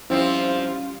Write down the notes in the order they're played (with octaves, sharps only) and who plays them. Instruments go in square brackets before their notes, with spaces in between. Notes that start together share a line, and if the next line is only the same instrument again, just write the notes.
[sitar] F3 C4 [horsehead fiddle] G3 F4 [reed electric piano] C#4 [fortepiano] E4